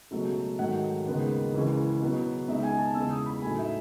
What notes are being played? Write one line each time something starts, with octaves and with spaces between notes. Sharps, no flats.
C#2 B2 F#3 A3
G#2 D#3 F#3 A3 F#5
D#2 C#3 G#3 B3 D#4
C#2 C#3 E3 G#3
B2 F#3 B3
C#2 B2 G#3 D#4 E5
G#5
A5
E2 C#3 G#3 E6
D#6
B5
A2 F#3 A3 D#4 G#5
E5